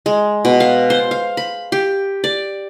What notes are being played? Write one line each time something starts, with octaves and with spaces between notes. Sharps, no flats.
G#3
B2
F5
C5
F5
B5
G4
D5